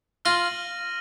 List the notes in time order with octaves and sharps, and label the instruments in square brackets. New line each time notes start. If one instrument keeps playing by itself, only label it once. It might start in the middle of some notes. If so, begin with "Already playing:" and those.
[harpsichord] F4 [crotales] F6 A#6 D#7 F#7